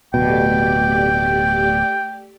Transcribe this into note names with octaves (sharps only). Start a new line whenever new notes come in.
D1 B2 A3 G4 D5 G5